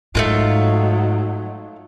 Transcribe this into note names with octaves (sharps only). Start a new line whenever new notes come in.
G#2 F#3 A3 A#3 D#4 F4